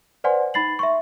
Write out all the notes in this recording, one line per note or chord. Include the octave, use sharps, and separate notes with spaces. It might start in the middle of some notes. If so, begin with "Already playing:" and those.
B4 C5 D5 F#5 G#5 C6
D#4 B5 A6 C7 F#7
E5 C6 C#6